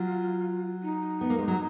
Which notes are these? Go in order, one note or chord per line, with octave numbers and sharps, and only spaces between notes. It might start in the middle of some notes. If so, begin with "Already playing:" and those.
Already playing: F#3 F4
D#4
B3
A#3
G#3
F#3